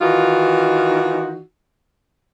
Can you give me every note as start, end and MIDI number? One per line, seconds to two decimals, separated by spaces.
0.01 1.41 51
0.01 1.41 52
0.01 1.41 63
0.01 1.41 65
0.01 1.41 66